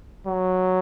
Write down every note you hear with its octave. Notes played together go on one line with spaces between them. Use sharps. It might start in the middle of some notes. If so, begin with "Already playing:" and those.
F#3